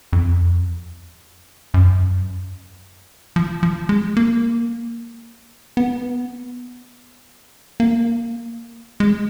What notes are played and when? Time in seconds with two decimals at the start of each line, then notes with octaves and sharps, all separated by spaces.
0.13 F2
1.74 F#2
3.36 F3
3.63 F3
3.89 G#3
4.17 A#3
5.77 B3
7.80 A#3
9.00 G#3